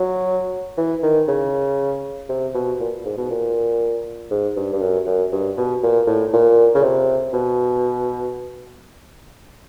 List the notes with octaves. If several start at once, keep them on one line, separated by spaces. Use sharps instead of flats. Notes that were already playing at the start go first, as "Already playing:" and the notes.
Already playing: F#3
E3
D#3
C#3
C3
B2
A#2
G#2
B2
A#2
G#2
G2
G2
F#2
F#2
G2
B2
A#2
A2
A#2
C#3
C3
B2